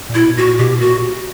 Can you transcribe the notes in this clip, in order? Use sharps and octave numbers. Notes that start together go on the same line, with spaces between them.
A#2
B2 E4
A#2 F#4
B2 G4
A#2 F#4